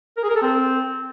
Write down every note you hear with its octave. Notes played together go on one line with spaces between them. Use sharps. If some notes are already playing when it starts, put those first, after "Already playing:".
A#4
G#4
A#4
A4
C4